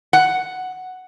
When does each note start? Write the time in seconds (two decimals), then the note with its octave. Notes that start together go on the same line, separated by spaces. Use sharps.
0.13 F#5